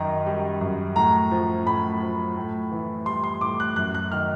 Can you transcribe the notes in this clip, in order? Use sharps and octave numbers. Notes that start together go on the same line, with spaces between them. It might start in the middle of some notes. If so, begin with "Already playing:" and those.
Already playing: F#2 D#3 A#5
G3
F#2
A2 A#5
F3
A2 B5
F3
A2
E3
G3 C6
C6
A2 D6
F#6
F#2 F#6
F#6
D#3 F6